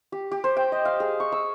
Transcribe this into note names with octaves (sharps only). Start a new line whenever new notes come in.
G4
G4
C5
G5
D#5
F5
G#4
C#6
E6